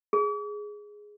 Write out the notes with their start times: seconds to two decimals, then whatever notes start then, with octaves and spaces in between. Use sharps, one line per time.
0.13 G#4